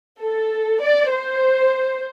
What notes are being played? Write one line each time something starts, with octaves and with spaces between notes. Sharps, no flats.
A4
D5
C5